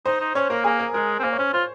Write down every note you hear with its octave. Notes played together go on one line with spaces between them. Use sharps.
D#4 C5
D#4
C#4 C#5
A#3 A#4
A#3 G#4
A#4
G#3 A#4
C4
A#3 C5
C#5
C#4 C5
F4 C5